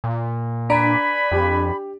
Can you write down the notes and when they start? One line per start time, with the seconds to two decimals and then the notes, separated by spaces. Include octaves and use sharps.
0.04 A#2
0.70 D4 B4 D5 G#5 A#5 B5 D7
1.32 F2 G4